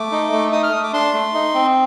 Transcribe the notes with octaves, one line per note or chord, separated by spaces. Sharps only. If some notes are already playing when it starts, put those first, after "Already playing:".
Already playing: A3 D6
D#4
A3
D#4 D#6
F6
A3 D#6
D6
D4 C6
A3
D#4
C4